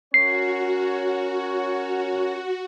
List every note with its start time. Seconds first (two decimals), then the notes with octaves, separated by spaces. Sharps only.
0.14 C#4 F#4 A#4 C#5 C7